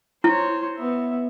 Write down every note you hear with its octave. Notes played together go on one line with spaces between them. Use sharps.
E4 C5 C#5
B3 E5